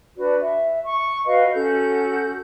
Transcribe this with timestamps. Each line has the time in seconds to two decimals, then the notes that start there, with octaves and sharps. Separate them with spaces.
0.16 D4 F#4 B4 D5
0.41 E5
0.83 C#6
1.26 F#4 B4 D#5 F5
1.54 C#4 F#4 A4 G6